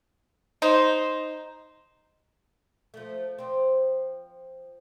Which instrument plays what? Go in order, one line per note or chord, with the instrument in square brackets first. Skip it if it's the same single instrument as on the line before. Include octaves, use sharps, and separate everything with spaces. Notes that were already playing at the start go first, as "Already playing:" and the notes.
[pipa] D#4 [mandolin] C5
[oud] F3 A3
F3 C4